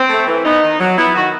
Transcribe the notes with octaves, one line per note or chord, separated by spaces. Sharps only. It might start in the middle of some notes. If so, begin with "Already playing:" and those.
Already playing: C4
A3
E3
B3 D#4
D#3
F#3
B3 E4
D#3 F#4